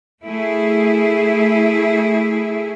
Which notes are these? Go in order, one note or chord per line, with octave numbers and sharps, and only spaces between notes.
A3 E4 G#4